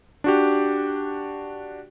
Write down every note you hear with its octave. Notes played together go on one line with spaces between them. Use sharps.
D4 F#4 G4